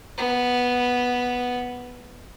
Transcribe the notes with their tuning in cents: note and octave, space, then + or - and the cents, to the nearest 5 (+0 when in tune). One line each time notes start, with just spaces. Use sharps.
B3 -5